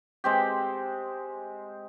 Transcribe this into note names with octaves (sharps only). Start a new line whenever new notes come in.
G#3 C4 G4